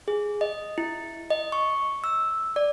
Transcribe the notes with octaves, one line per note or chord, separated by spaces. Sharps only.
G#4
D#5
E4
D#5
C#6
E6
D5